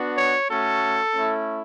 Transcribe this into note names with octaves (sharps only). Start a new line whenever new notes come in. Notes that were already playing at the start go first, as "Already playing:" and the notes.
Already playing: B3 D4 F#4
C#5
A3 C#4 F#4 A4
A3 C#4 E4